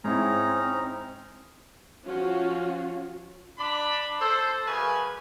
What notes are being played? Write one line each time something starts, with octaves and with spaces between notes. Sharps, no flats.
G#2 C4 C#4 D#4 E4 A#5
F3 C#4 F4 F#4
D4 D5 B5
A4 C5
F#2 C#3 B4 G#5